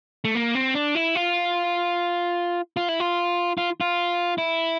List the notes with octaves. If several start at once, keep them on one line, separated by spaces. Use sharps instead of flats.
A3
A#3
C4
D4
E4
F4
F4
E4
F4
F4
F4
E4